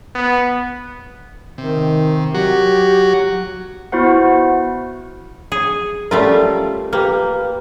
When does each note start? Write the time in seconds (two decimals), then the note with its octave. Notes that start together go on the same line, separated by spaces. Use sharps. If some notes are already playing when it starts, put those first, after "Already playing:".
0.15 B3
1.58 C3 D#3
2.35 F#3 F#4 G4
3.92 B3 E4 F#4 C5 F#5
5.52 G#4
6.11 G3 A3 C#4 F4 A#4
6.93 A#3 G4 B4 F6